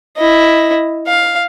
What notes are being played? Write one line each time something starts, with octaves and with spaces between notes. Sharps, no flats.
E4 D#5
F5